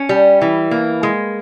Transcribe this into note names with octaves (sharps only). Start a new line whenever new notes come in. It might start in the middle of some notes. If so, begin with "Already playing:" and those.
Already playing: C#4
G3
E3
A#3
G#3